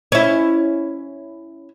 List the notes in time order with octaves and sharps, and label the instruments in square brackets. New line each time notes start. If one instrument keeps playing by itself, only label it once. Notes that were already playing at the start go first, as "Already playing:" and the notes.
[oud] C#4 E4